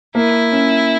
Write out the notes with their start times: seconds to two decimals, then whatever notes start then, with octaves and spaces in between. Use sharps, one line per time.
0.15 A#3 E4
0.52 C#4